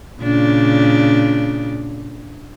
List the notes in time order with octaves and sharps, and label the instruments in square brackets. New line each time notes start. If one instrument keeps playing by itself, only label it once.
[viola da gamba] A#2 C#3 D4